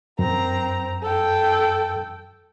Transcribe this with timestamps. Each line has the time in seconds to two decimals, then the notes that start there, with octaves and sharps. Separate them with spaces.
0.19 F#2 C4 A#5
1.03 A4 G5